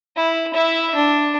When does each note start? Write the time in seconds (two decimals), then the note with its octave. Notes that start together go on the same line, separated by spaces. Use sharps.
0.16 E4
0.54 E4 E5
0.95 D4